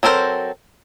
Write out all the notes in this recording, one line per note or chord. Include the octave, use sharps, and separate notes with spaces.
F#3 C4 A4 A#4 C5